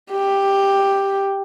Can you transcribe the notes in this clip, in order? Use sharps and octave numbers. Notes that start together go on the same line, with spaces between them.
G4